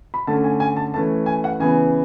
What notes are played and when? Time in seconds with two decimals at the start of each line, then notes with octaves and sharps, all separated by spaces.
0.14 B5
0.27 D3 A3 C#4 A5
0.44 G#5
0.60 G#5
0.76 A5
0.94 E3 A3 C#4 A5
1.26 G#5
1.44 F#5
1.60 C#3 E3 B3 G#5